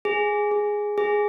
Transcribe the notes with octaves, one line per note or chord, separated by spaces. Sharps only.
G#4
G#4
G#4